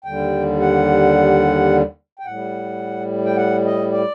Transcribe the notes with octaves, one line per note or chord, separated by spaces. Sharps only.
D#2 D3 G3 G5
F#5
G5
A2 G3 F#5
G5
F#5
D#5
D5